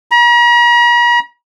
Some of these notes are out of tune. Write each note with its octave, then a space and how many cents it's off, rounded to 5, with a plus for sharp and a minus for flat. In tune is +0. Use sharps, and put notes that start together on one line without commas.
A#5 +45